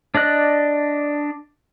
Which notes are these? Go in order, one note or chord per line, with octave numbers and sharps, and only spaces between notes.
D4 D5 D#5 F#6